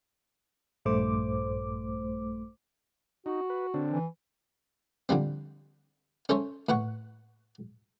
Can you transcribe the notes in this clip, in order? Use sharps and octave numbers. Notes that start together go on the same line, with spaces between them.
A#1 G2 A3 C5 D6
D#4 F#4
B4
D3 C4 D4
E3
D3 F3 G3 C4
C#4 A4 C5 C#5 E5
A2 B4 F#5 C#6